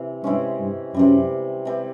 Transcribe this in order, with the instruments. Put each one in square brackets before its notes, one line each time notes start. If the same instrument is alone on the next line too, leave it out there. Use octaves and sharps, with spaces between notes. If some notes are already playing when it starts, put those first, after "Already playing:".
Already playing: [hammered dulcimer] C3 E3
[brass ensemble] G2 [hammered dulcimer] C3 E3 G#3 C#4
[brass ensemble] G2
[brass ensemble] F#2 [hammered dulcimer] C3 E3 G3
[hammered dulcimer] C3 E3 G3